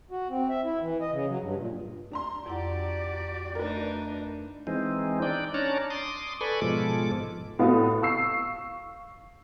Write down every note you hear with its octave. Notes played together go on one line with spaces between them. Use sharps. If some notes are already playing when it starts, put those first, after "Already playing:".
F#4
C4
E5
E4
E3
D#5
C#3
F#3
G2
A#2
D4 A#5 C6
F2 E4 F#4 G4 D5 F#5
A3 D4 D#4 A#4 B4
E3 G#3 C4 D#4
D4 D#4 D5 G5
C#4 D4 C#5 D5 A5 A#5
C6 D6 D#6
A4 B4 D5 G#5 B5 C#6
G#2 B2 F3 G#3 A4 D6
A2 B3 F4 F#4 D#6
F5 C#6 E6 C7